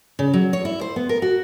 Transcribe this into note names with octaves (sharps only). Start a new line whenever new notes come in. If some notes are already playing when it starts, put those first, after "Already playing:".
C#3
F#3
C#5
E4
C5
B3
A#4
F#4